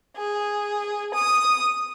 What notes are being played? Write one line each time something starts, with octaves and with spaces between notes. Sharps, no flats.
G#4
D#6